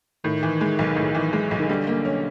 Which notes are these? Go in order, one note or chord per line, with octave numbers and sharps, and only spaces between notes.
A2 D#3
E3
G#3
B1
A2
E3
G#3
B1
D#3
D3 G3
A#3
C#4